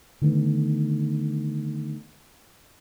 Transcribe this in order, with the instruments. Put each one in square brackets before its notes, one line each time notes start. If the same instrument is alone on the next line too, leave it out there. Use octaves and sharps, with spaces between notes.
[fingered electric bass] D3 D#3 A3 B3